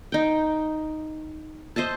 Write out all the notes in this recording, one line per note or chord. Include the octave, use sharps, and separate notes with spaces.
D#4 G5
C5 D#5 E5 A5